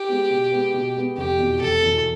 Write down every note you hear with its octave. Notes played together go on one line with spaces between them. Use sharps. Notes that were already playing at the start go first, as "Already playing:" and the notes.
Already playing: G4
G#3 B3
B2
G#3 B3
B2
G#3 B3
F1 G4
E2 B2
F1 A4
E2 B2